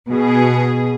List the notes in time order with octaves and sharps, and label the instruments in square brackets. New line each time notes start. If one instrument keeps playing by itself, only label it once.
[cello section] B2 G#4